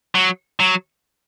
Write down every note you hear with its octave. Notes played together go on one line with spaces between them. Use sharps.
F#3
F#3